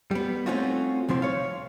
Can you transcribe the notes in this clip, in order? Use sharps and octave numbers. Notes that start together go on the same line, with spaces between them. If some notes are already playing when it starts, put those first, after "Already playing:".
G3 B3
A3 C4 C#4 D#4 F4 F#4
C2 F3 C4 C6
C#5 F5